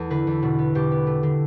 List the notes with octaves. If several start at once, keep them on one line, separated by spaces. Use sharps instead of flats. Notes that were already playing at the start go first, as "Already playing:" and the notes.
Already playing: E2 A3 A4
D3 B4
E2
B2
B3
B2 G4
B3
A3
D3